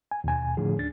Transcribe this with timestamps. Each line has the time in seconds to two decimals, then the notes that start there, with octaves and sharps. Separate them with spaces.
0.11 G#5
0.24 D#2 B2 G#5
0.57 A2 D3 F3 G#4
0.78 D2 D4 A6